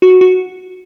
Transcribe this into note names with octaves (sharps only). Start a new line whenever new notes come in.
F#4
F#4